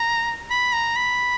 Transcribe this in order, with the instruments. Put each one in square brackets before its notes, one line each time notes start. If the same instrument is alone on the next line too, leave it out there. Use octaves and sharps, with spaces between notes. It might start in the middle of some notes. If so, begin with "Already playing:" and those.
Already playing: [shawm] A#5
B5
A#5
B5